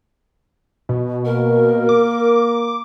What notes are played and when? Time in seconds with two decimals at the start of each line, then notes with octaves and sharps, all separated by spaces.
0.89 B2
1.25 A#3 A#4
1.89 D6